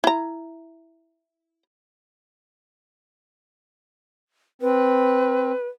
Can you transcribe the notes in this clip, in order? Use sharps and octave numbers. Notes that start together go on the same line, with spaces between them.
E4 A#5
C4 B4